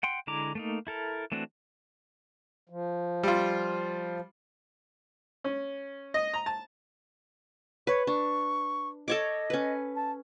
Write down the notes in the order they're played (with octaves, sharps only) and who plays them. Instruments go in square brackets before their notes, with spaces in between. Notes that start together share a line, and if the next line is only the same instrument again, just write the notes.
[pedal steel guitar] F#5 G5 C6
D3 G#3 E4 A#5 D6
A3 A#3 D#4
E4 A4 A#4
E3 A3 C4 D4 F#4
[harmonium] F3
[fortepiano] G3 F4
C#4
D#5
A#5
A5
[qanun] B4 [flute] C#5
[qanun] D4 [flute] C#6
[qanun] A4 C#5 D6 [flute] D#5
[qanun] C#4 B4
[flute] A5